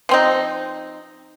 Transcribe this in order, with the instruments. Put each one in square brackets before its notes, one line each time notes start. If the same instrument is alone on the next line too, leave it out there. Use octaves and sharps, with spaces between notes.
[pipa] F3 C4 D#4